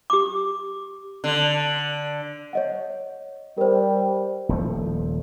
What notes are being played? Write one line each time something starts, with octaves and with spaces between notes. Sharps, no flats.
G4 D6
D3
C#5 D#5 F#5
G3 A#4 C5
D#1 F3 A3